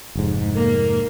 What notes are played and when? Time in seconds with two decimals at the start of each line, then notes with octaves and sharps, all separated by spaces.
0.15 F1 G#2
0.55 A#3